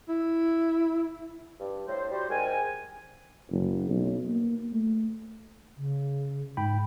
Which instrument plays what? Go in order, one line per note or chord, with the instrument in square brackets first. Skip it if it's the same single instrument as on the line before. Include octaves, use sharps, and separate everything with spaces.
[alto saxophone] E4
[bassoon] G2
[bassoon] A2 [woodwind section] C5
[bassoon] G3 [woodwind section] F#4 C5
[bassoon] G#2 [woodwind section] A#4 G5 G#5
[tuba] F#1
B1
A#3
A3
[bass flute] C#3
[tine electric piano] G#2 G5 B5